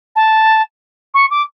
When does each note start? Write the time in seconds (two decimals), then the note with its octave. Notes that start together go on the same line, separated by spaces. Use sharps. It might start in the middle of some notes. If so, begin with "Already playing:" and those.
0.16 A5
1.14 C#6
1.31 D6